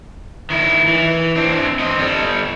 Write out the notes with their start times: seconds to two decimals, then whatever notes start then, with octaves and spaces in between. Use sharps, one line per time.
0.50 D#3 E4
0.88 E3
1.36 C4 D4
1.79 C4 D#5
1.98 G3 A4